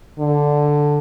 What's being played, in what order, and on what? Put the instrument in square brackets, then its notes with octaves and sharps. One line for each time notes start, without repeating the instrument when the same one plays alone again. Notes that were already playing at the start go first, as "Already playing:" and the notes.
[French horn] D3